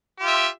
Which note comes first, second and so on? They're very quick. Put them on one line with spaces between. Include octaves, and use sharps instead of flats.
G4 F4 E5